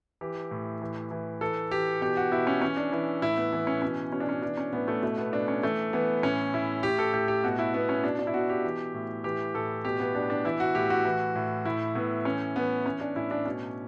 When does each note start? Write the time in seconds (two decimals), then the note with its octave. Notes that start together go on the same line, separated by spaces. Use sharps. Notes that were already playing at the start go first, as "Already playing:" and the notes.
0.21 E3 G4
0.51 A2
0.82 E3
1.11 E3
1.41 E3 A4
1.71 E3 G4
2.01 B2 G4
2.17 F#4
2.32 B2 E4
2.47 C#4
2.62 E3 C#4
2.77 D4
2.92 E3 E4
3.22 A2 E4
3.37 B3
3.53 E3 B3
3.67 C#4
3.82 B2 C#4
4.12 B2 C#4
4.20 D4
4.29 C#4
4.42 E3 D4
4.57 C#4
4.72 A2 B3
4.88 A3
5.03 B2 A3
5.18 B3
5.33 B2 D4
5.48 C#4
5.63 E3 A3
5.93 E3 B3
6.23 A2 C#4
6.54 A2 E4
6.83 A2 G4
6.99 A4
7.13 A2 G4
7.28 G4
7.44 B2 F#4
7.59 E4
7.74 B2 B3
7.89 C#4
8.04 B2 D4
8.19 D4
8.27 E4
8.34 B2 F#4
8.50 G4
8.64 E3
8.94 A2
9.24 E3 G4
9.54 A2 A4
9.84 B2 G4
10.00 B3
10.15 B2 D4
10.30 D4
10.45 E3 E4
10.60 F#4
10.75 A2 G4
10.90 F#4
11.05 E3
11.35 A2
11.65 A2 E4
11.95 A2 B3
12.25 E3 C#4
12.56 E3 B3
12.85 E3 C#4
13.00 D4
13.16 A2 E4
13.31 D4
13.46 B2 C#4